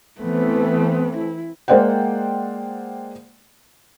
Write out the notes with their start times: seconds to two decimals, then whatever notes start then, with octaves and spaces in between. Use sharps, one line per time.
0.21 E3 A3 B3 C4
1.17 E4
1.68 G#3 A#3 C5 D5 F#5 G5